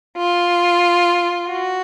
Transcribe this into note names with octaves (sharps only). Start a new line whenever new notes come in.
F4
F#4